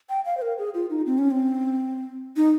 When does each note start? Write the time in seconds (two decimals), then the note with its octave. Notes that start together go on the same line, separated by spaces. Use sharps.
0.09 G5
0.25 F5
0.37 C5
0.42 A#4
0.58 G#4
0.74 F4
0.90 D#4
1.06 C4
1.18 C#4
1.31 C4
2.36 D#4